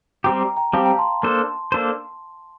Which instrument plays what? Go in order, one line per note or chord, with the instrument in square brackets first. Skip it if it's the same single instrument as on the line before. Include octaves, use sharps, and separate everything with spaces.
[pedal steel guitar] G3 C4 G4 [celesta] G5 A#5
[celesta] G5 A#5
G5 A#5
[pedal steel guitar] G3 C4 G4 [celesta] F5 A5
[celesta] G5 A#5
A5 C6
[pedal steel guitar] A#3 D4 A4 C5 [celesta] A5 C6
[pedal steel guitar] A#3 D4 A4 C5